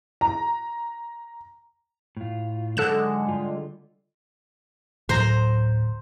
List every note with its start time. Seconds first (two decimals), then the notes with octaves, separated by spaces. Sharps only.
0.21 A#5
2.17 A2 F4
2.77 G#2 D3 F#3 G#3 A4 F#5 F#6 E7
3.28 G3 F4
5.09 D1 A2 F#3 C5 A#5